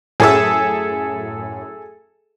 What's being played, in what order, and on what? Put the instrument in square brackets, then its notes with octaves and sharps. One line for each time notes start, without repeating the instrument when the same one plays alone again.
[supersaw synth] F#2 A2 [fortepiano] G#4 A4 E5